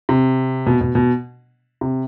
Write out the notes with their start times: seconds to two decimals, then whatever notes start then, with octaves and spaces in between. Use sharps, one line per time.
0.09 C3
0.67 B2
0.81 B2
0.95 B2
1.81 C3